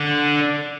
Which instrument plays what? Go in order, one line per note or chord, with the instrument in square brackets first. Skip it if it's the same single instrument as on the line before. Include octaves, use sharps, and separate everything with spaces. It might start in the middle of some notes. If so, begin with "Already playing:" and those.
Already playing: [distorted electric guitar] D3